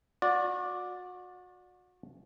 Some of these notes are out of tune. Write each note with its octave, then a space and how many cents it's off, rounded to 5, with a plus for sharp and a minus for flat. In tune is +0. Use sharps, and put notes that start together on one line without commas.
F#4 -35 D5 +0